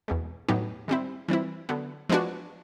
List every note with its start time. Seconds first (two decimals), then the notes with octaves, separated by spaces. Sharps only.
0.08 E2 B2 G#3
0.49 A2 F#3 B3 D#4 G4
0.88 D#3 G3 C4 E4
1.28 E3 G3 C4 E4
1.69 D3 F#3 B3
2.09 F3 G#3 B3 D4 F#4